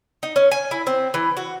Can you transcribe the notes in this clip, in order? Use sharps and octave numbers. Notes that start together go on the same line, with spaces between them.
D#4
C#4
G#5
E4
C4
E3
F#4